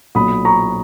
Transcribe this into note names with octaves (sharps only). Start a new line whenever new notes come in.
B1 A#2 B5 D#6
A#5 C#6